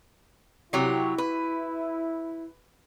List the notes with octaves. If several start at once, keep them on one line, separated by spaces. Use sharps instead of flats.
C3 F#3 E4 G4
B4